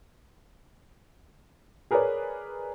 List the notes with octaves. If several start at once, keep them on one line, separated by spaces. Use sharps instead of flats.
G#4 A#4 B4 C#5 D5